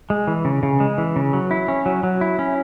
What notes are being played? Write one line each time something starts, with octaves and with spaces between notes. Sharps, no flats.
G#3
E3
C#3
C#3
G#3
E3
C#3
F#3
E4
C#4
F#3
F#3
E4
C#4